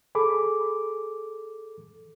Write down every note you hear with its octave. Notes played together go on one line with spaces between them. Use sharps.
G#4 A4 B5 D6